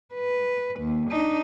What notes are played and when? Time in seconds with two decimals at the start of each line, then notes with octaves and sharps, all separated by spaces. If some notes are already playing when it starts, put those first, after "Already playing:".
0.15 B4
0.80 D#2
1.11 D4 D#4